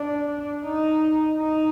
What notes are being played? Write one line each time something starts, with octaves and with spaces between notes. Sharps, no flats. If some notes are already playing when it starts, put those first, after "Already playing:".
Already playing: D4
D#4
D#4